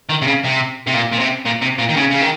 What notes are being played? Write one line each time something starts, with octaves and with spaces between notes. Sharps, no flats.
D#3
C3
C#3
C3
C3
A#2
A#2
C3
A#2
C3
A#2
D#3
C#3
C#3
D#3